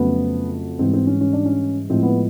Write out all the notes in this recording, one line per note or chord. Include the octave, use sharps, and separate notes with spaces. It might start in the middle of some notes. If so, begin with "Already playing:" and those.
Already playing: F2 C#3 F#3 A3 B3
G#2 E3 G3 C4
C4
C#4
C#4
D4
C#4
A2 F3 G#3 C4
B3